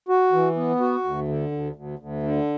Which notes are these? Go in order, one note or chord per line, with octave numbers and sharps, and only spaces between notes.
F#4
E3
B3
F#4
D2
D3
D2
D2
D2
D3